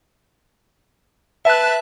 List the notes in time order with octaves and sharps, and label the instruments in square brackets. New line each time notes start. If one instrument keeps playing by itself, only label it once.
[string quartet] B4 A5 [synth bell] E5 F#6